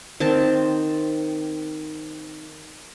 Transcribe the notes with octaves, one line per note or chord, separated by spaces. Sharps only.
D#3 C4 A5